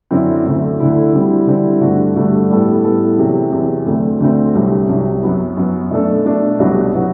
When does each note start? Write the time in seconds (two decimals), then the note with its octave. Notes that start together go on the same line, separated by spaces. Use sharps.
0.11 F#2 D3 F#3 C4 E4
0.45 D2 D3 A3 E4
0.79 D2 D3 A3 E4
1.13 D3 G3 C4 E4
1.47 D3 G3 C4 E4
1.81 G2 D3 A3 D4 F#4
2.16 G2 D3 A3 D4 F#4
2.50 A2 G3 B3 E4 A4
2.84 A2 G3 B3 E4 A4
3.18 E2 C3 F#3
3.52 E2 C3 F#3
3.86 D2 D3 A3 C4
4.20 D2 D3 A3 C4
4.55 C2 C3 F#3
4.89 C2 C3 F#3
5.23 F#2 F#3 B3
5.57 F#2 F#3 B3
5.91 B2 A3 D4 A4
6.25 B2 A3 D4 A4
6.59 C2 B2 F#3 B3 F#4
6.94 B2 F#3 B3 F#4